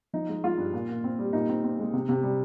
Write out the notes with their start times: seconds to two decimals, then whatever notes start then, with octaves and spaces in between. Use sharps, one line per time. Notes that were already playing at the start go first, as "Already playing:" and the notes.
0.13 F3 D#4
0.29 G#3
0.43 G#3 F4
0.58 G2
0.74 A#2
0.89 A#2
1.04 C4
1.19 G3
1.33 A#2 D#4
1.49 C4
1.64 C4
1.79 G#3
1.93 C3
2.09 C3
2.23 G3